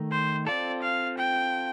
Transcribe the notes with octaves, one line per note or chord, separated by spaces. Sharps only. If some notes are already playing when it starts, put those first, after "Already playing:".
Already playing: D#3 A3 D#4
C5
C4 F4 A4 D5
F5
G5